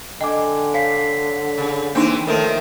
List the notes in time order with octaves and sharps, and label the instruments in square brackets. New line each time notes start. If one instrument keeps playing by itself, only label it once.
[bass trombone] D3 [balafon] D#5 [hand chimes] G5 G#5 D6
[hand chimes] C#5 B6 C7 [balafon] F5
[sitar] C#3
[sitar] E3 C4 [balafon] A#3 D4 D#4
[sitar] D#3 F3 [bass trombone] A3 [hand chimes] A#4 C#5 E5